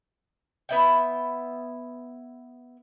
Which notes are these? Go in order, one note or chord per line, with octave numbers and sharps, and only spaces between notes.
B3 E4 G5